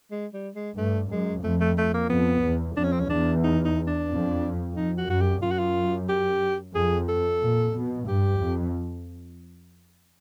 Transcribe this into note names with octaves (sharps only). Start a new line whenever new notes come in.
G#3
G3
G#3
G2 A3
F#2 G#3
F2 A3
A3
A3
A#3
F2 B3
E2
F2 D4
C#4
C4
C#4
E2 D4
D#4
D#4
D4
F2
F2 D#4
F#4
F#2 F#4
G4
F#2 F4
F#4
F4
G4
F2 G#4
A4
A#2
B2
G2 G4
F2